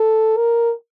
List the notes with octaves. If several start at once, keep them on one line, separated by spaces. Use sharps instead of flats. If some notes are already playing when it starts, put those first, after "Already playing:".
Already playing: A4
A#4